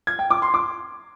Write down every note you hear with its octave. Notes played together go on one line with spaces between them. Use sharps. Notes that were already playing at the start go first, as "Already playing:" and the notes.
G#6
G5
D6
C6
D6